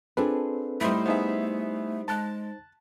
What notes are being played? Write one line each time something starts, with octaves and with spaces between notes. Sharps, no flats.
C4 D4 F4 G#4 A4 B4
A2 G3 A3 D#4 E4 C5
B3 D#4 G#4 C5 E5
G#3 A5 F#6